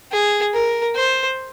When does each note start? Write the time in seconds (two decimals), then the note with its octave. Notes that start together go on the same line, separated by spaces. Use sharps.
0.12 G#4
0.54 A#4
0.96 C5